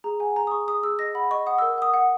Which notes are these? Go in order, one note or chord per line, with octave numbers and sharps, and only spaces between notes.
G#4 A#5
F#5 G#5
G#4 A#5
D#6
G#4 C#6
G#4 D#6
G#4 E6
D#5 A#6
F#5 B5
D#5 C#6
F#5 D#6
A#4 E6
F#5 D#6
F#5